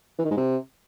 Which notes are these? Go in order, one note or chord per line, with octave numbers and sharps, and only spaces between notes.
E3
D#3
G#2
C3